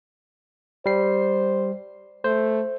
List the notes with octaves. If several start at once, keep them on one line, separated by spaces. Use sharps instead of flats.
G3 C5 C7
A3 C5